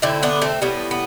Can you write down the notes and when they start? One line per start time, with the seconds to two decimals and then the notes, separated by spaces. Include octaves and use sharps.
0.02 D3 A3 C4 E4
0.23 B3 D4
0.42 A3 C4
0.62 A2 G3 B3
0.91 B3